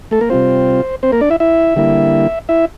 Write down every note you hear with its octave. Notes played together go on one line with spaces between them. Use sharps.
A3 A4
A#3 A#4
C3 G3 C4 F4 C5
C4 C5
A#3 A#4
D4 D5
E4 E5
E4 E5
D3 G3 A#3 E4
E4 E5